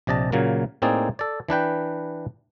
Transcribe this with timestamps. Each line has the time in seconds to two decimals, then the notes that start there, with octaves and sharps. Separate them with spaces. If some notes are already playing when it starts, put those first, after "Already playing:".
0.07 A#1 C3 D5 D#5 A5
0.32 A#2 C#3 F#3 A#3
0.82 A2 A#3 C4 D#4 G#4 D5
1.19 A4 D5
1.49 E3 D4 B4 G5